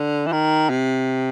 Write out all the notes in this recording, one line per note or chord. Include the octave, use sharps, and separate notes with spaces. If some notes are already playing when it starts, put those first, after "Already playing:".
Already playing: D3
E3
D#3
C3